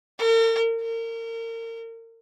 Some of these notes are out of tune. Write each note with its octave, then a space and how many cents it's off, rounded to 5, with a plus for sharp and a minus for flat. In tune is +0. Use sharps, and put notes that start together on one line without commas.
A#4 -45
A#4 -30